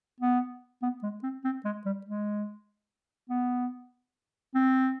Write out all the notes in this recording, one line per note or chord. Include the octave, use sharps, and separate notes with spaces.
B3
B3
G#3
C4
C4
G#3
G3
G#3
B3
C4